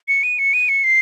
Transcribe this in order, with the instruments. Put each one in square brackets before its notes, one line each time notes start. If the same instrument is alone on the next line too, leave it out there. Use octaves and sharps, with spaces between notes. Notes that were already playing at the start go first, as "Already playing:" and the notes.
[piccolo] C#7
D#7
C#7
D#7
C#7
C7